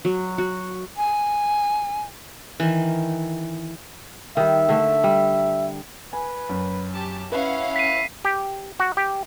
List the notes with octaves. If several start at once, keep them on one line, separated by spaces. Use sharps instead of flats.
F#3
F#4
G#5
D#3 E3
D#3 G3 E5
D3 A3
G3
B4 G#5
F#2
G4 A5
C#4 E4 B4 F5 F#5
B6 C7 D#7
G4
F#4
G4